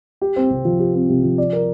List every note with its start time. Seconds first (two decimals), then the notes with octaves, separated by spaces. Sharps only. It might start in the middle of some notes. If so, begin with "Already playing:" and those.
0.22 G4
0.36 C4
0.50 C3
0.65 F3
0.79 G4
0.95 C4
1.09 C3
1.23 F3
1.38 D5
1.53 A#4